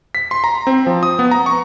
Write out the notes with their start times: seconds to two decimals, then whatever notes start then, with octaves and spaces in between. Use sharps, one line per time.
0.15 B6
0.31 C6
0.44 A#5
0.67 C4
0.87 F3
1.03 D#6
1.19 B3
1.31 A#5
1.46 C#6